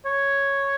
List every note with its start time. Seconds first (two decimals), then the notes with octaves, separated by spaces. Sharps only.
0.05 C#5